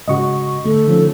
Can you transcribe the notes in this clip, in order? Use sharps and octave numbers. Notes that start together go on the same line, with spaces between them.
G#2 C#3 F#4 D#5 C#6
D3 A3 A4
D#3 F3 C#4